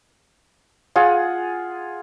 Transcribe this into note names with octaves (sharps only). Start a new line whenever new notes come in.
F4 G#4 F#5